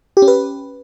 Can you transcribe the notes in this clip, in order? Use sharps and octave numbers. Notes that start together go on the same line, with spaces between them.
G4
C#4
B4